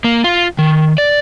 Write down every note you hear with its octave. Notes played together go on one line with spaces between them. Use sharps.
A#3
F4
D#3
D5